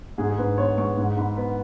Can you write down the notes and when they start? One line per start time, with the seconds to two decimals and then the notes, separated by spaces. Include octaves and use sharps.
0.18 G#2 G#4
0.30 G#4
0.38 G#2 B4
0.58 B3 C#5
0.77 G#3 C#6
0.97 G#2
1.17 G#2 B5
1.36 B3 B5